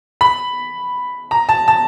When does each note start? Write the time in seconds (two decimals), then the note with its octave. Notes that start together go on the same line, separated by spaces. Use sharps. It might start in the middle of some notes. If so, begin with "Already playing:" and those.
0.21 B5
1.31 A#5
1.49 A5
1.68 A5